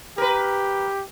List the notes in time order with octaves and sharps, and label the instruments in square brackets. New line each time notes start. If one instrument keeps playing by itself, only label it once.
[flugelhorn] G4 [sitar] A#4 B4